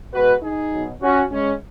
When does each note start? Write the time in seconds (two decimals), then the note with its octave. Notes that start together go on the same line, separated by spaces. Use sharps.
0.13 B2 G#3 F#4 B4
0.42 D#4 G#4
0.72 B2 F#3
1.02 C#4 F#4
1.31 C#3 G#3 C#4